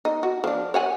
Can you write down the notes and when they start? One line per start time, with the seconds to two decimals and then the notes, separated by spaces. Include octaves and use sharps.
0.05 D#4
0.23 F#4
0.44 F3 D4
0.74 C#5 F#5 G#5